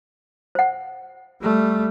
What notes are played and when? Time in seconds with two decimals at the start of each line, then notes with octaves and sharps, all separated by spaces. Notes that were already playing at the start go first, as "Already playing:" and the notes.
0.55 C5 F#5
1.42 G3 A3